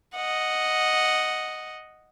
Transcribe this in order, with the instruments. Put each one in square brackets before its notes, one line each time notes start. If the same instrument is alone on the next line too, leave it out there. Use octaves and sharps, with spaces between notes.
[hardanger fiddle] D#5 F#5